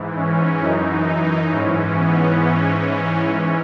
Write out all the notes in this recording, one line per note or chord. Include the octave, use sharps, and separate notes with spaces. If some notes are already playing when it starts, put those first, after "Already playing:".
Already playing: G#2 E3
C#4
F#2 E3 D#4
G#2 E3 C#4
B3
G#2 E3 C#4